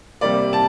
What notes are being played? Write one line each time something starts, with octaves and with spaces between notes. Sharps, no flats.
C3 G3 A#3 D5
A5